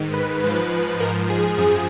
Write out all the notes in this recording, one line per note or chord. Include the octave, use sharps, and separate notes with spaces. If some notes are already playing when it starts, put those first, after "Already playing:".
Already playing: G#2 D#3
B4
G#2 F3 B4
G#2 F3 A#4
G#4
F#2 F3 G#4